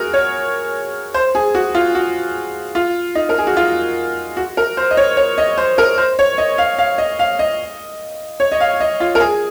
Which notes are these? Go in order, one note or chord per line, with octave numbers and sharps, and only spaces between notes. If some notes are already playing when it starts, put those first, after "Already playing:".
Already playing: F#4 G#4 A#4
C#5
C5
G#4
F#4
F4
F#4
F4
D#4
A#4
G#4
F#4
F4
F#4
A#4
C5
D#5
C#5
C#5
D#5
C5
A#4
C5
C#5
D#5
F5
F5
D#5
F5
D#5
C#5
D#5
F5
D#5
F4
A#4
G#4